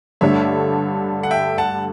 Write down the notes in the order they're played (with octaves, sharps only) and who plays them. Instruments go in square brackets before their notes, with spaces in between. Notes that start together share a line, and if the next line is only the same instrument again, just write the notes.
[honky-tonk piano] G2 D3 A3 D4 A4 [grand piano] C#5 E5
[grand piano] F#5
E5 G5
F#5 A5